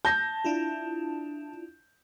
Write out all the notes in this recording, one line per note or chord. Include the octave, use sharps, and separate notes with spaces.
A5 G6 A#6
D4 E4 F4